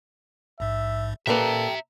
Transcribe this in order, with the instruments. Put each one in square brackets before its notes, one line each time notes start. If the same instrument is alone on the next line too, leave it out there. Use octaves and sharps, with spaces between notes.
[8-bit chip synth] A#1 G#2 [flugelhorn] E5
[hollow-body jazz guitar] A#2 A#3 B4 [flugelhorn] A4 [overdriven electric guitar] E5 A#5 [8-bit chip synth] G5